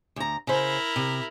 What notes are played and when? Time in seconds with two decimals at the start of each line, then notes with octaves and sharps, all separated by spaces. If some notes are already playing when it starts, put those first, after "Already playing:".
0.16 D2 A#5
0.47 C#3 E4 A#4 C5
0.96 C3